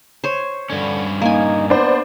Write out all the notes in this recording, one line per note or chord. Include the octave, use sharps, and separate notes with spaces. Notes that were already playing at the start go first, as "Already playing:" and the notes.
C5 C#5
G2 D3 C#4
A#3 D#4 G#5
B3 D4 C5